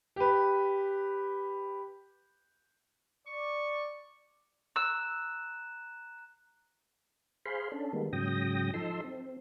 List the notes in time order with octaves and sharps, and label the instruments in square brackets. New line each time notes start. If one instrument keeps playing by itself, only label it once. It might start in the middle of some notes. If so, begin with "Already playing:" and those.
[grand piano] G4 B4
[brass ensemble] D5 [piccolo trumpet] C#6
[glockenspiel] A#5 F#6 E7 [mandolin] E6
[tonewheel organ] G#4 C5 F5 B5 C6
C#4 D4 A4
D#3 G3 G#3 A#3 B3
G#2 C#3 F#3 G5 D#6 A#6
F3 D#4 A4 C6 E6
C4